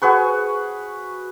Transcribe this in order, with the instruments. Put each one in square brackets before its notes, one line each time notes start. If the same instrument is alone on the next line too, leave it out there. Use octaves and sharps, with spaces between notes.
[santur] F#4 G#4 B4 C#6